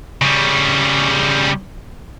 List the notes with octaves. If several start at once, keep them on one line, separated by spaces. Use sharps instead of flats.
C#3 G3